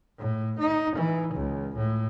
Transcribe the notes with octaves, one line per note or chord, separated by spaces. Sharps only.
A2
D#4
E3
C#2
A2